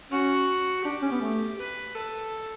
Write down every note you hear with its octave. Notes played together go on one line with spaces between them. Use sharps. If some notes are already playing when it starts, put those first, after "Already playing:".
C#4 F#4
D4 G4
C#4
B3
A3
B4
A4